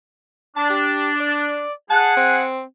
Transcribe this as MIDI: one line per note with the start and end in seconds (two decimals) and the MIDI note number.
0.56 1.60 62
0.56 0.67 81
0.70 1.10 67
1.20 1.73 74
1.90 2.40 68
1.90 2.40 78
1.90 2.16 81
2.16 2.62 60